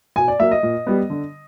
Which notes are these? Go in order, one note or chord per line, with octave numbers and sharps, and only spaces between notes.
B2 G#5
D5
F#3 A#3 E5
D#5
A#2
G3 B3
D3